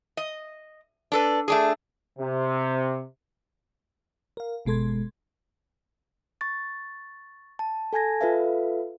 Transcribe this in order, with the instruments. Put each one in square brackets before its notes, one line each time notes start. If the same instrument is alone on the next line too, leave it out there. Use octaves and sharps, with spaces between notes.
[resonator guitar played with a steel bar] D#5
D4 A4 B4
A3 D4 G#4
[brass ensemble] C3
[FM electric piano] A#4 F5
G1 B2 G#3 A4 C6 G#6
[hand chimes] C#6 A6
A5
A4 G#5 A5 G#6 A#6
F4 A4 B4 E5 F5